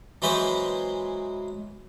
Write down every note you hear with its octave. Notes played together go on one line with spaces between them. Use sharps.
E3 F#3 G#3 C4 B4 C5